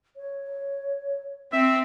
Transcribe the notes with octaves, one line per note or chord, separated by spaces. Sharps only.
C#5
C4 E5